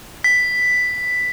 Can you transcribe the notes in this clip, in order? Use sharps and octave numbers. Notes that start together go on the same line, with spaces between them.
B6